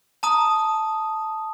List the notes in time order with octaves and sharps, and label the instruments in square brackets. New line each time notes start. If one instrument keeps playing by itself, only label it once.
[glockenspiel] A5 A#5 D#6